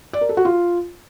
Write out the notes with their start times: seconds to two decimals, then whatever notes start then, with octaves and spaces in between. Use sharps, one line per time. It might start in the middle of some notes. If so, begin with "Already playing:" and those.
0.13 D5
0.21 A#4
0.29 A4
0.37 F#4
0.45 F4